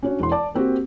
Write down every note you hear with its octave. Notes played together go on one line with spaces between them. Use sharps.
C#4 D4 F#4 C#5
E1 E2 E3 C6
D5 A5 D6
A#3 C4 F#4 G4